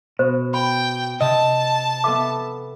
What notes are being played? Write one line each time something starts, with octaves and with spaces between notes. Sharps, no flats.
B2 C5
G5 B5
C3 D#5 A5
B3 A4 E5 D6